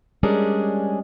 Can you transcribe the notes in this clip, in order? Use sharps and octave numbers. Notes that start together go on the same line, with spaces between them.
G3 G#3 C#4 D4 G#4 A#4